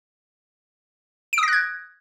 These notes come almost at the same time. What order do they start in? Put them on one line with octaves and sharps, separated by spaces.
D7 D#6 A#6 F#6 G#6